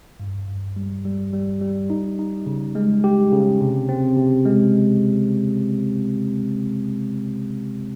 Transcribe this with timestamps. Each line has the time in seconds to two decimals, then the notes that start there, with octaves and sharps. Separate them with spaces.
0.20 G2
0.48 G2
0.76 G3
1.05 G3
1.33 G3
1.61 G3
1.90 D#4
2.19 D#4
2.46 C#3
2.75 G#3
3.04 G4
3.32 C#3
3.61 C3
3.89 C4
4.17 C3
4.45 G#3